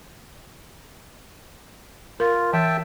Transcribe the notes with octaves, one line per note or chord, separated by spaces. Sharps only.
F4 A#4
E3 E5 G5 A5